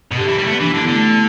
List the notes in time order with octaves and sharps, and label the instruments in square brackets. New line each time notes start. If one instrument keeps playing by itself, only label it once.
[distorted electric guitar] B2
[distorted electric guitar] D3 [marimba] G4
[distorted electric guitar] E3
G3
A3
B3
[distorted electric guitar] E3 [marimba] D4
[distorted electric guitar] D3 [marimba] E4
[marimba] B3
[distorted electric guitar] D3 [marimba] A3